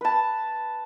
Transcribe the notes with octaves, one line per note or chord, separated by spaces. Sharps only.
B4 A5